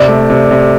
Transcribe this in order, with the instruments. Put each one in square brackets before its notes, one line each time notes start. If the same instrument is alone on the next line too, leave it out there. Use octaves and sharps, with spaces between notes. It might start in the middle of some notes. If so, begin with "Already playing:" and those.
Already playing: [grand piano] C3 [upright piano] D5
[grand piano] A3
C3
C3